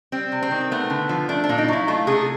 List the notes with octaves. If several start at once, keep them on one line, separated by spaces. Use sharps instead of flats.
G3 C4
C3
C4
D#3
A3 B3
D3
F3
A3 D4
D4
A#2
D#4
F#3 E4
A3 F4
C3 G#4